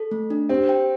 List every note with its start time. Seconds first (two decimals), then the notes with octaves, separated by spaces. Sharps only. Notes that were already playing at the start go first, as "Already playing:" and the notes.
Already playing: A4
0.11 A3
0.30 D4
0.49 C4 G4
0.69 G5